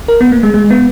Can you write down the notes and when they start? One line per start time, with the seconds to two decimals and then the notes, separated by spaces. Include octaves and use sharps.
0.08 A#4
0.21 B3
0.32 A#3
0.43 G#3
0.54 G#3
0.70 B3